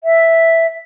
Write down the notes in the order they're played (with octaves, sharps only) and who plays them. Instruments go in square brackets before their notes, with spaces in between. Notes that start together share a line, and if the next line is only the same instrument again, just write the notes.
[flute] E5